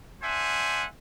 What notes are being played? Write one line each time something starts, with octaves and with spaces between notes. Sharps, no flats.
D4 C5 E5 F#5 G#5